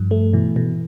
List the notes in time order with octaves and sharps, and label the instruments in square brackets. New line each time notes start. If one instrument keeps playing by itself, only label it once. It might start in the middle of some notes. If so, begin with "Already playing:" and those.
Already playing: [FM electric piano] G2 [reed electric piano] F3
[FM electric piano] A3
[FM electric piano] B2 [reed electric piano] E3
[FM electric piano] B2